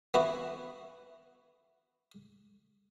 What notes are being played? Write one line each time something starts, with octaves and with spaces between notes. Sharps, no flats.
B3 E4 F#4